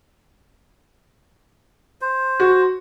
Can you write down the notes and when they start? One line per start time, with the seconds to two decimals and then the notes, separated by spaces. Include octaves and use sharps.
2.01 C5
2.40 F#4